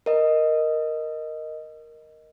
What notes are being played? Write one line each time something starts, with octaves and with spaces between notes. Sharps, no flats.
A#4 D#5